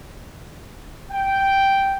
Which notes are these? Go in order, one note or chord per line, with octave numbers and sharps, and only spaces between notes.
G5